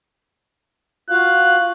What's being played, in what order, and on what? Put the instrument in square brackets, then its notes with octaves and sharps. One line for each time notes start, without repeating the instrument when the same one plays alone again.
[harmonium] F4 F#4 F5 [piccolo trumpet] F#6